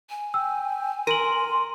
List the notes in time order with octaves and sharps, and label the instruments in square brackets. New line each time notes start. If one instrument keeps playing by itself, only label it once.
[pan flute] G#5
[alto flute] G5 [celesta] E6
[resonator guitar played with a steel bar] A#4 [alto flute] C6 [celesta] D#7 F#7